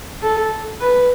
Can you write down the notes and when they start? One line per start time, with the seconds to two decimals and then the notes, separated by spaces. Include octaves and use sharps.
0.22 A4
0.81 B4